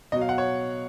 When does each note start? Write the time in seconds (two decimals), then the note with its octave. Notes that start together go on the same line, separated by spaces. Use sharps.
0.12 B2 F#3 D#5
0.21 F5
0.29 F#5
0.38 C#5